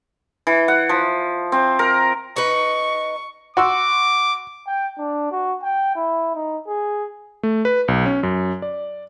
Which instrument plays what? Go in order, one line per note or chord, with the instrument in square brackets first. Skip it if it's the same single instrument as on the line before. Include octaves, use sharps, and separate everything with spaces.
[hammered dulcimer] E3
F#5
F3
C4
A#4
[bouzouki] D#4 B4 [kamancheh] C#6
[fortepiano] F#4 C6 E6 [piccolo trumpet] D6
[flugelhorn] G5
D4
F#4
G5
E4
D#4
G#4
[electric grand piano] A3
B4
B1
C#4
F#2
D5